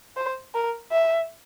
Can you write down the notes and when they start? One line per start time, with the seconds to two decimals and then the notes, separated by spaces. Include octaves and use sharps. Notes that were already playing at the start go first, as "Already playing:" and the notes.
0.17 C5
0.55 A#4
0.92 E5